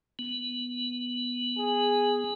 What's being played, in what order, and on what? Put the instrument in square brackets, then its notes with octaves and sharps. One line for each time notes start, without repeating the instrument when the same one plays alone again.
[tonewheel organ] B3
[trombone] G#4